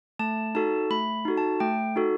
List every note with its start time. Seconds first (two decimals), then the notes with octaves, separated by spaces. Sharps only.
0.19 A3 A5
0.55 D#4 F#4 A4 A5
0.90 A3 B5
1.25 D#4 F#4 A4
1.37 A5
1.60 A3 G5
1.96 D#4 F#4 A4